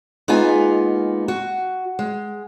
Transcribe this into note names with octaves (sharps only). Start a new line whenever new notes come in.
G#3 A#3 B3 D#4 F4 G#5
F#4
G#3